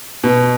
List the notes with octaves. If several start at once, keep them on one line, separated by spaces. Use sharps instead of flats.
B2